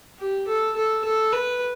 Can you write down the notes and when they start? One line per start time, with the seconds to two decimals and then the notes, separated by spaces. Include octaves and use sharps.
0.19 G4
0.47 A4
0.76 A4
1.04 A4
1.32 B4